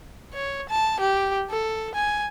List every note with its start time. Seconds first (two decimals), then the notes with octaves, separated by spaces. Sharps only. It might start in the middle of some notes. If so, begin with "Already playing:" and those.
0.34 C#5
0.70 A5
1.00 G4
1.50 A4
1.95 G#5